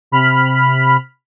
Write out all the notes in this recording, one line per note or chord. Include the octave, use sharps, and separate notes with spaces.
C3 B5 F6 B6